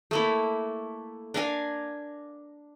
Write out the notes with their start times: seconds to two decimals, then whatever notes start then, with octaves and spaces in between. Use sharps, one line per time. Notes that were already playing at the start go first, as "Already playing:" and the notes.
0.11 A3 A#3 E4
1.34 D4 A#4 F5 G#5